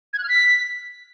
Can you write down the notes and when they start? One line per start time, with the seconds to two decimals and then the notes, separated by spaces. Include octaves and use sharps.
0.13 G#6
0.18 F#6
0.24 F6
0.29 B6